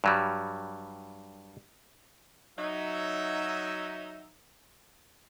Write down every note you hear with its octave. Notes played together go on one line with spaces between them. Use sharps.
G2 F#3 G3
F#3 D#4 E5